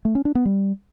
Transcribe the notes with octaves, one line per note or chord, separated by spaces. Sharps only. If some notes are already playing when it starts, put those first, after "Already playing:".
A3
C#4
D4
B3
G3